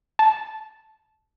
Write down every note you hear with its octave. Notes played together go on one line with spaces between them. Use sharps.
A5